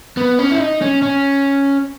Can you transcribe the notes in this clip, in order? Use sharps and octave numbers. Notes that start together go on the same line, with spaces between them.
B3
C#4
E4
D#4
C#4
C#4